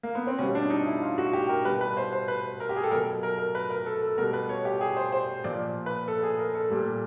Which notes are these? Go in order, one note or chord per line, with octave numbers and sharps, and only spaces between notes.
A#3
B3
C4
B2 G3 C#4
D4
D#4
E4
F4
F#4
G4
A#4
B2 G3 B4
B4
C5
C5
B4
A#4
G4
G#4
A4
B2 F#3 A#4
A#4
A#4
B4
A#4
A4
A4
B2 G3 A#4
B4
C#5
G4
G#4
C5
C5
A#2 F3 D5
B4
A4
G#4
A#4
A4
A#2 G3